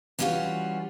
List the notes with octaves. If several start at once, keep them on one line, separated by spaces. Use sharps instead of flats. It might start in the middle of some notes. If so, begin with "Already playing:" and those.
E3 G3 C#4 D4 F4 F#4